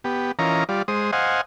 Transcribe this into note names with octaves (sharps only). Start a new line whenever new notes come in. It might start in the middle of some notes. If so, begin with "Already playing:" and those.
B3 G4
E3 C#4 F4 A#4 D#5 A#5
G3 F4 D5
G#3 C5 D#6
C5 D#5 F5 F#5 G#5